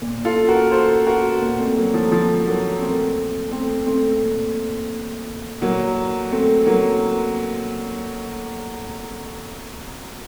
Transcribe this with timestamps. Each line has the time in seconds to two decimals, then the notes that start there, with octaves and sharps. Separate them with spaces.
0.02 A#2
0.25 F4 A4
0.48 F#4 A#4
0.71 A4 C5
1.06 F#4 A#4
1.41 A#2
1.59 A3 C4
1.76 F#3 A#3
1.94 F3 A3
2.12 F3 A3
2.47 F#3 A#3
2.81 A#2 A3 C4
3.51 A3 C4
3.86 A3 C4
4.21 A#2
5.61 A#2 F#3 A#3
6.31 A3 C4
6.66 F#3 A#3